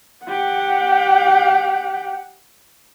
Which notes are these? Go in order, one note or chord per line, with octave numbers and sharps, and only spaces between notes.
G4 F#5